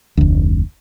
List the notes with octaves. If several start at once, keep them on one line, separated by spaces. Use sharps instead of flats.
F1 D2